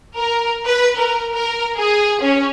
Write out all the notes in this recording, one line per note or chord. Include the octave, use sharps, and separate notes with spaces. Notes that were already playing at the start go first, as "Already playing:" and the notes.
A#4
B4
A#4
A#4
G#4
C#4